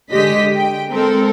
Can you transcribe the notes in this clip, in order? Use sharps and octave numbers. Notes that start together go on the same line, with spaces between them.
D3 G#3 G4 D#5 B6
G5
G#3 C4 A4 A#4